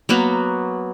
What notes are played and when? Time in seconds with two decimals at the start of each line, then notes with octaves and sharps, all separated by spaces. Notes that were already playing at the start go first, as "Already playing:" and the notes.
0.09 F#3 A#3 B3 F#4